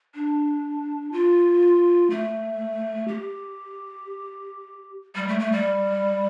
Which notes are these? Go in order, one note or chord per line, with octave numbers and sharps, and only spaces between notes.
D4
F4
A3
G4
G3
A3
A3
G3